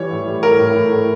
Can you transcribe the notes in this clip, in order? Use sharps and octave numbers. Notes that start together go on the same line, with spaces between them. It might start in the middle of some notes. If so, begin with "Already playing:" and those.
Already playing: E3 G3 C#5
A2
G3
A2 A#4
A2
A2
A2